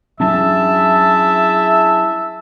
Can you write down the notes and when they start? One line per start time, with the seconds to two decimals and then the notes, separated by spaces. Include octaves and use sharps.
0.20 F#3 C#4 D4 E4 G#4 E5 A5